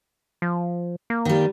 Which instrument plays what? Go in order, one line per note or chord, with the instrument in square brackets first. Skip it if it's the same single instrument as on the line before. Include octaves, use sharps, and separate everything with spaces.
[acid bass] F3
A#3
[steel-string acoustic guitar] D#3 G3